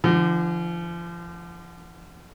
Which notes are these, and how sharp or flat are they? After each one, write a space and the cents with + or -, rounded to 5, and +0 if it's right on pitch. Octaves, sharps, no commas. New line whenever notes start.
D3 +15 F3 -35